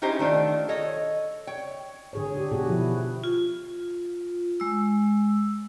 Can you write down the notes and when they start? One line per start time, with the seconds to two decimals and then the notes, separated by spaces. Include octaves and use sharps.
0.02 C#4 D#4 E4 G4 C5 D#5
0.19 D#3 A3 D4 F4
0.68 A4 C#5 D#5
1.47 C#5 G5
2.13 D3 G#4 C#5
2.34 D4 G4
2.52 B2 F#4 G#4
2.69 F3 E4
3.24 F4
4.60 G#3 E6